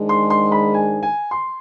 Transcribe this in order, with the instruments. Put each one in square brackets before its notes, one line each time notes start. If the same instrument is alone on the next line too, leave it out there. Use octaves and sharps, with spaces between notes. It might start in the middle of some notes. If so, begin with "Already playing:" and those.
Already playing: [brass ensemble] G#2 D#3 G#3 D4
[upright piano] C6
C6
B5
G#5
G#5
C6